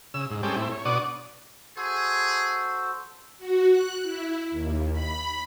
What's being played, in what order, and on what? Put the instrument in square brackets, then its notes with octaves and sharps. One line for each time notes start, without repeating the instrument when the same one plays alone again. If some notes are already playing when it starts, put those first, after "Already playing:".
[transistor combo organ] C#3 E6
G#2
G3 G#3 C4 C#4 A4 G5
A2 C4 E4
C#5
B2 D4 D5 F#5 C#6 D#6
[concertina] F#4 A4 C5 [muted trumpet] G#4
[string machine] F#4
F#6
E4
D#2
B5